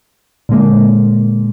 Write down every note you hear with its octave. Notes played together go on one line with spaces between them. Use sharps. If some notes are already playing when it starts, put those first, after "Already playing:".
A#2 D3 G#3 A#3